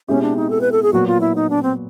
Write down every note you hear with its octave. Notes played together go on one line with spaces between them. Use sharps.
B2 G#3 C4 C#4 E4 G4
D4
D#4
A4
B4
A4
G#4
A#2 F#3 B3 F#4
F4
E4
D#4
D4
C4